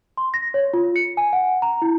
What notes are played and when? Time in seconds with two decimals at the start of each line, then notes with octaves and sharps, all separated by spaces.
0.17 C6
0.34 A#6
0.54 C#5
0.74 F4
0.96 C#7
1.17 G#5
1.33 F#5
1.62 A#5
1.82 E4